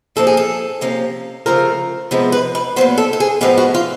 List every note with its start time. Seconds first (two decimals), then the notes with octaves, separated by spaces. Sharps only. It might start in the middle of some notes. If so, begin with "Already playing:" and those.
0.16 A#2 F3 A#3 A4
0.27 G#4
0.37 A4
0.81 C3 F3 A#3 C#4
1.46 C#3 F3 A3 A#4
2.11 C3 F3 G#3 B3
2.32 B4
2.55 B4
2.76 A#2 F#3 B3 C5
2.98 A4
3.13 A4
3.20 G#4
3.41 A2 F3 G#3 B3 G4
3.58 F#4
3.74 F4